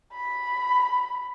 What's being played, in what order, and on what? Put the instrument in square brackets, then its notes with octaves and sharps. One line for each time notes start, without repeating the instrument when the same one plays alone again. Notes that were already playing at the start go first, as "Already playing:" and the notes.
[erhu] B5